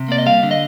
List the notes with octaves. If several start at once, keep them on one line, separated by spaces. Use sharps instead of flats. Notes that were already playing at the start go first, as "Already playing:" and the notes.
Already playing: C3
A#3 D5
D#5
G3 F5
D3
D#5